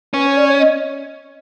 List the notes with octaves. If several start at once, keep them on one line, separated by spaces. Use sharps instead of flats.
C#4 B4
C#5
D5
C#5
D#5